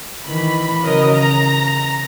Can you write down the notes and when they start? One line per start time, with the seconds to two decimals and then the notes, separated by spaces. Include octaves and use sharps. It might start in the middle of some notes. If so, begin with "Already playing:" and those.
0.26 D#3 E3 B5
0.84 C#3 F#3 A#4 D#5
1.14 A#5